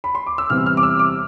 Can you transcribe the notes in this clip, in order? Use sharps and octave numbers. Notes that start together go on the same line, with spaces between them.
B5
C6
D6
E6
C3 E3 G3 B3 F6
F6
D6
E6
D6